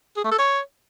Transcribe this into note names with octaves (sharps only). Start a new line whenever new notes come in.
G#4
A3
A4
C#5